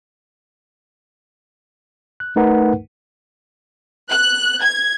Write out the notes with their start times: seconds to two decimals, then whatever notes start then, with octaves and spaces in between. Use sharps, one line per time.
2.20 F#6
2.36 A3 D#4 A#4 B4 F#5
4.10 F#6
4.62 G#6